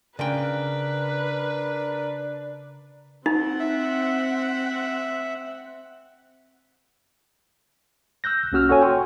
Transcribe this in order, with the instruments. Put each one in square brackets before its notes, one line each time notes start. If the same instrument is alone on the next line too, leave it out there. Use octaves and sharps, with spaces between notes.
[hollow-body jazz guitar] C#3 G5 [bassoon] D4 [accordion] A#4 [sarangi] B4
[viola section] C4 F#5 [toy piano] D#4
[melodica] E5
[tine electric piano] E6 F#6 G6 A#6
B1 A#3 C#4 F#4 E6 F6
F#4 A4 C#5 G#5
G5 C6 C#6